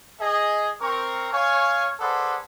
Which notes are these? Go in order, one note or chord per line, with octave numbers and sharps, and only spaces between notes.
G#4 D#5
C4 A#4 C#6
C#5 F5 G#5
G#4 A4 B4 C5 D5 F#5